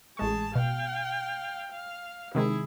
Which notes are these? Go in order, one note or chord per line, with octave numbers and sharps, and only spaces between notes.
A1 G#3 G#4 A5 C#6
B2 F5 G5
F5
C3 D#3 G#3 E4 G#4